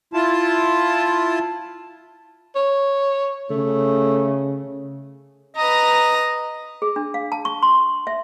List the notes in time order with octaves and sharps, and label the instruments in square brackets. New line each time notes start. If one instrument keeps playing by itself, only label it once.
[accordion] E4 F4 A5
[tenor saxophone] C#5
[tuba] C#3 [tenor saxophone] A3
[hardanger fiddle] B4 A#5 [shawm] D#5
[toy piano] G#4
D4
F5
A5
C#6
C6
E5